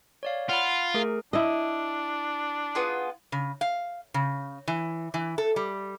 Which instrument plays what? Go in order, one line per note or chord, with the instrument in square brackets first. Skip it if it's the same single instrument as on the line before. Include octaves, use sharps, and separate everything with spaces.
[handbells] C#5 D5 F5
[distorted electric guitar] F4 [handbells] F#5 B5
[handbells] A3 G#4 A#4
[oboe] D4 [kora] E4 D#5
[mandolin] B3 F4 G#4
[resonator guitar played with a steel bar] C#3
F5
C#3
E3
E3
A4
G3